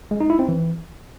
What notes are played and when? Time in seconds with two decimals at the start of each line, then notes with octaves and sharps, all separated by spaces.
0.11 G#3
0.20 D#4
0.30 E4
0.39 C4
0.48 E3